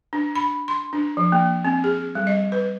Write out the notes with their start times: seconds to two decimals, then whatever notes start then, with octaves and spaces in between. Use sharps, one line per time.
0.13 D4
0.35 B5
0.68 C6
0.93 D4
1.17 F3
1.32 A#3
1.65 C4
1.84 G#4
2.15 G3
2.27 D#5
2.52 B4